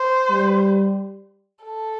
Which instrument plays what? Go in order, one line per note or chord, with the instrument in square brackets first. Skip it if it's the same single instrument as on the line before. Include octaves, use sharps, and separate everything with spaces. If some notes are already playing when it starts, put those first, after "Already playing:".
Already playing: [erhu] C5
[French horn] G3
[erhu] A4